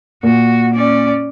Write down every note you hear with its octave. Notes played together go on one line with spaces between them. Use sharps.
A#2 F#4
C#4 D5